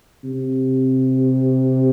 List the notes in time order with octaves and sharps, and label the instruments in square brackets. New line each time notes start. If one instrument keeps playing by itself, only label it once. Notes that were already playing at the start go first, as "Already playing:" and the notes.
[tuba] C3